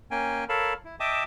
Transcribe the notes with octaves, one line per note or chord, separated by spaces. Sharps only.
A#3 C#4 G5 G#5
A4 A#4 C#5 F5 A5 B5
E4
D#5 E5 G5 A5 D6 D#6